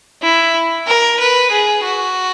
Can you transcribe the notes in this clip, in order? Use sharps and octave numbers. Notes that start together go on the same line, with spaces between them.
E4
A#4
B4
G#4
F#4